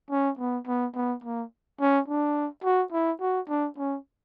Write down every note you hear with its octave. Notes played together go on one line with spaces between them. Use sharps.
C#4
B3
B3
B3
A#3
C#4
D4
F#4
E4
F#4
D4
C#4